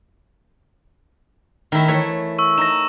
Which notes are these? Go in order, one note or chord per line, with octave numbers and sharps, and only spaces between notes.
D#3 A3 E4
E3 A3 C#5
C#6 E6
D#4 A#6 E7